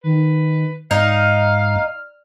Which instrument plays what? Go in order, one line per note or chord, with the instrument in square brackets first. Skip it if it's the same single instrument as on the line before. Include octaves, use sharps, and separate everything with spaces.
[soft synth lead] D#3 [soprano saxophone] B4
[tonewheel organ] G#2 [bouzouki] D#4 [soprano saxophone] F5 [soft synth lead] F6